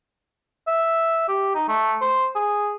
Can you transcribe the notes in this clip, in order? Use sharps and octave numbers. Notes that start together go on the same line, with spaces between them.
E5
G4
D#4
A3
C5
G#4